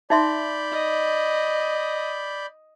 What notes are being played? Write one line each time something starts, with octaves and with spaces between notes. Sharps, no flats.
D#4 D5 E5 B5 C6 G6
D#5